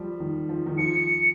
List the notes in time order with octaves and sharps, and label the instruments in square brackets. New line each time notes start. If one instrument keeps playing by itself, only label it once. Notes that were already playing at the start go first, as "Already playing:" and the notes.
Already playing: [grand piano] F3 G3
D#3
F3
D#3
[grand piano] F3 [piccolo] C#7